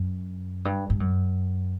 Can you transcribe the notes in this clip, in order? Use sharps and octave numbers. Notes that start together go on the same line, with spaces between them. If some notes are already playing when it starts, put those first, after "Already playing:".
Already playing: F#2
G2
G2
F#2